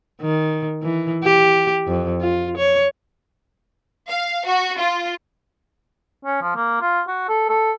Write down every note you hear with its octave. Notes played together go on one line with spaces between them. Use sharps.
D#3
E3
G4
F2
F4
C#5
F5
F#4
F4
C#4
F3
A#3
F4
F#4
A4
A4